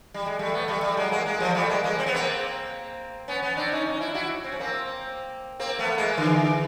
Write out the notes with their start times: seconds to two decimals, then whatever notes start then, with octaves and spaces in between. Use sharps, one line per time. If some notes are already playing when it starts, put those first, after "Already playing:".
0.14 G3
0.26 G#3
0.39 G3 A3
0.54 A3 B3
0.68 G3 A3
0.83 G3 A3
0.97 F#3 G#3
1.11 G#3 A#3
1.26 G#3 A#3
1.40 F3 G3
1.55 G3 A3
1.69 G#3 A#3
1.83 G#3 A#3
1.99 C4
2.06 B3
2.15 A#3 C4
3.28 B3 C#4
3.42 B3 C#4
3.57 C4 D4
3.72 C#4 D#4
3.86 C#4 D#4
4.00 D4 E4
4.14 E4 F#4
4.44 C4
4.52 C#4
4.60 A#3 C4
5.60 A#3 C4
5.79 A3 B3
5.98 G#3 A#3
6.17 D3 E3